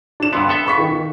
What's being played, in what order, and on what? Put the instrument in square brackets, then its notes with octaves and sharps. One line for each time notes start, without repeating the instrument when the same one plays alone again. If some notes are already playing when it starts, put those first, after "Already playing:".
[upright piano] D4 E7
[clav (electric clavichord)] G2 D3 B3 [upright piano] C6
[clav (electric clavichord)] B3 A4 E5
[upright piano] B5 C#6 B6
D#3